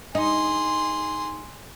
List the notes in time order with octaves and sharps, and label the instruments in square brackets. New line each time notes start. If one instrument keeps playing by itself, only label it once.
[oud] D#4 [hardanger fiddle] G#4 C6